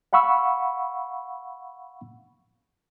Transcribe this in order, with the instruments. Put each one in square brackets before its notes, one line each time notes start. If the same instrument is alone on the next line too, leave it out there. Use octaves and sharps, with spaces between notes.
[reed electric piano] F5 F#5 B5 C#6 E6